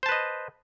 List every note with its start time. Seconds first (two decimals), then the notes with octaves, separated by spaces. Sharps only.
0.03 C5
0.06 A5
0.09 B4
0.12 D#5